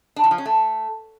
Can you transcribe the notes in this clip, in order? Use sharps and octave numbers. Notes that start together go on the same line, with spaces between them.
D4
E3
F3
C#4
A3